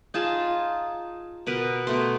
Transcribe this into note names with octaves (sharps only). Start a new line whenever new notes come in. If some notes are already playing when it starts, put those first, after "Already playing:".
D#4 F4 G#4 A5
B2 A#4 B4
B2 A3 C6